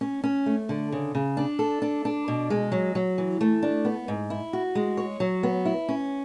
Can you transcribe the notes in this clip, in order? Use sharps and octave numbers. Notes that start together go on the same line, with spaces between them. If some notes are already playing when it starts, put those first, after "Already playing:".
C#4
C#4
A3
D3
C#3
C#3
D4
A4
D4
D4
B2
G#3
F#3
F#3
E3
A3
D4
B3
G#2
E4
F#4
G#3
C#5
F#3
B3
E4
C#4